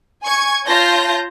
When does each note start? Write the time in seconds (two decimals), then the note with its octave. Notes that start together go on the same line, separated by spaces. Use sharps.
0.23 G#5 C#6 G#6
0.66 F4 C#5 A5 G6 A#6